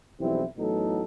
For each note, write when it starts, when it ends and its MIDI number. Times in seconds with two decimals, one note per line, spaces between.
0.21 0.44 35
0.21 0.44 52
0.21 0.44 53
0.21 0.44 55
0.21 0.44 60
0.21 0.44 64
0.58 1.04 33
0.58 1.04 45
0.58 1.04 54
0.58 1.04 59
0.58 1.04 63
0.58 1.04 69